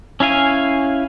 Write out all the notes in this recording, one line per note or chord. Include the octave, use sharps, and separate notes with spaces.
C#4 E4 F5 G#5